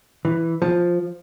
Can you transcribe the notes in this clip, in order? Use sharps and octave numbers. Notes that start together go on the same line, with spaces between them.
E3
F3